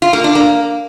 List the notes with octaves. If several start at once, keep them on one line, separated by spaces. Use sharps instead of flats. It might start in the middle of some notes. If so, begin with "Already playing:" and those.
F4
A#3
D4
A#3